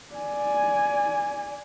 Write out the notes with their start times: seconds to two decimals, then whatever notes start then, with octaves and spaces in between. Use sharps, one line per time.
0.14 D5 G#5